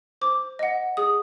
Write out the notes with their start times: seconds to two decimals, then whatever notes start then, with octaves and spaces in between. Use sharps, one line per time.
0.21 C5 D6
0.59 D#5 F#5
0.97 G#4 D#6